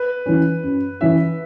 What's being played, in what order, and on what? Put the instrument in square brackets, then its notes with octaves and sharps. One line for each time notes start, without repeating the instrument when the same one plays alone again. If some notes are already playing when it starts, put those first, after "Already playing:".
Already playing: [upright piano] B4
[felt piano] E3 C#4
F#2
[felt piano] E3 C#4 [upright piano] E5